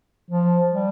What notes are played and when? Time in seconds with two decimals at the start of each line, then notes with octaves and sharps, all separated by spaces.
0.31 F3
0.71 G3